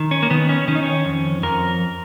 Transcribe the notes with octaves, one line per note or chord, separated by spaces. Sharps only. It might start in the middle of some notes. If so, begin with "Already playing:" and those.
Already playing: D#3
C#4
A#3
D#3 B3
C#4
D#3 C#4
D#4
C#4
F2
F2 A#4